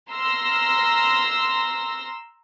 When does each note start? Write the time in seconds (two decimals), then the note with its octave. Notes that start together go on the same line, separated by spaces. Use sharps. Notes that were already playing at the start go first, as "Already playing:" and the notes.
0.11 A#5 C6 E6 F6 A#6